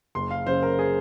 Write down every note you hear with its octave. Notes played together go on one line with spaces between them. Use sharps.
F#1 C6
F5
F#2 C#3 C5
A#4
G#4